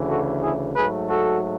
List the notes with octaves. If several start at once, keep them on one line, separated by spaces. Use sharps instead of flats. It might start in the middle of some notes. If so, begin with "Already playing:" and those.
Already playing: D2 C#3 E3
F#4 A4
E4 G#4
G#2 F#3 A3 G#4 B4
F#4 A4